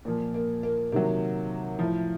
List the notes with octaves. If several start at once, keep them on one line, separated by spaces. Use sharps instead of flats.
A#2 F3 A#3
A#3
A#3
C3 D#3 F#3 A#3
A2 F3